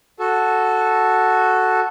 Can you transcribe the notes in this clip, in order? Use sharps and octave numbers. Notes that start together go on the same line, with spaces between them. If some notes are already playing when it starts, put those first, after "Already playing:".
F#4 A4